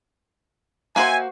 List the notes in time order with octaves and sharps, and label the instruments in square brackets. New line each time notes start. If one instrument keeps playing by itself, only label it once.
[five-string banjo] A#3 F#4 C5 [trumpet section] E5 G#5